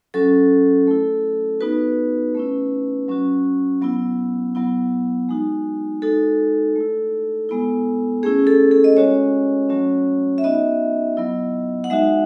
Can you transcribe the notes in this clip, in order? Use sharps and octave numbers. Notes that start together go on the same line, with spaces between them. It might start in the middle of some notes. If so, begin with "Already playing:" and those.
F#3 C#4 F#4 A4
A3 E4
B3 D#4 F#4 B4
A3 C#4 E4
F#3 C#4 F#4
F#3 B3 E4
F#3 B3 E4
G#3 D#4 F#4
G#3 D#4 F#4 A4
A3 E4
G#3 B3 E4
A3 C#4 E4 G#4
A4
A4
D#5
G#3 C#4 F#4 C#5
F#3 A3 C#4 F#4
E5
B3 D#4 F#4 D#5
F#3 B3 E4
F#5
G#3 D#4 F#4 E5